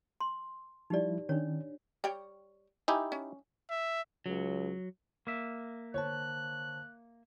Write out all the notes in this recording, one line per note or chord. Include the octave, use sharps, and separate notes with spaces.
C6
F3 G3 D#4 E4 G4 D5
D#3 C#4 D4 C#5
G3 C#5 G5
D#4 E4 G4 G#5
C#4
E5
C#2 F#3
A#3 E5
D3 C5 C#5 A5 F#6